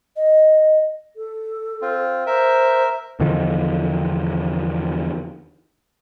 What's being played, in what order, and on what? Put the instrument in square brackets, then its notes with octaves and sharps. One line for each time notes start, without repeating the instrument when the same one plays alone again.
[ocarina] D#5
[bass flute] A4
[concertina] C4 F4
[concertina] A#4 E5 [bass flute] C5
[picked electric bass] E2 D3 D#3 F3